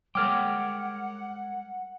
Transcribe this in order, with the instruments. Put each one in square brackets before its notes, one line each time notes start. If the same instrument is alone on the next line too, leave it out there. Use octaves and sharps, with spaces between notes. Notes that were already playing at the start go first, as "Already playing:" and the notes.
[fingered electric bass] G3 G#3 [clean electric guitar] A#4 C#5 G5 [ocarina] F#5 [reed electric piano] D6 F6